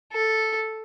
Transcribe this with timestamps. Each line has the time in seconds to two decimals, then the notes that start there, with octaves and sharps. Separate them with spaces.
0.12 A4